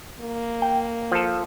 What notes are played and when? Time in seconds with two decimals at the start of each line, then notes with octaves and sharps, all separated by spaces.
0.20 A#3
0.62 G5
1.12 F3 A4